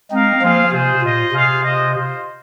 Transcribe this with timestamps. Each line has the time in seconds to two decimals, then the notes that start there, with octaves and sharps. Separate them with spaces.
0.11 G#3 C4 D#4 A#4 F5
0.42 F3 A#3 C4 F4 G#4 F5
0.72 C3 G#3 F4 G#4 C5
1.02 A#2 F4 C5 D#5
1.32 C3 F4 G#4 C5 F5
1.63 G#3 F4 C5 D#5
1.94 F4 C5 D#5